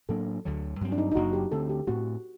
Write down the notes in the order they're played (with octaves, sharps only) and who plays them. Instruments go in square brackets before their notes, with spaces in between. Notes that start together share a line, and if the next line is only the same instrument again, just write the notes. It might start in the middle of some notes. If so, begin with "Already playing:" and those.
[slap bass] A2 F#3 A#3 D4 [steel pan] A4
[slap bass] D2 D3 F#3
G2 F#3 C4
[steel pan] D4
D#4
D#4
[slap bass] F#1 F#2 F#3 A#3 [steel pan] F#4
[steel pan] G4
[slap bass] D2 D3 A3 C4 [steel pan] A4
[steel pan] G4
[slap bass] A2 A3 C4 [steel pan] F#4